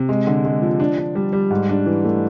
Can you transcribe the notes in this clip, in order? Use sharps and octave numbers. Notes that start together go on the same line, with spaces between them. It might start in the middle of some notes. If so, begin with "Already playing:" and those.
Already playing: C3
G#3
D3
G#3
F3
D4
D4
G3
G3
G#2
D4
E3
A3